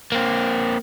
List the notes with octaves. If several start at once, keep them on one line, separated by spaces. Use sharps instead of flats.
A#3 C4